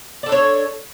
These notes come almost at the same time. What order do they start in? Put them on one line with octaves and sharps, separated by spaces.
D5 A4 D4 C#5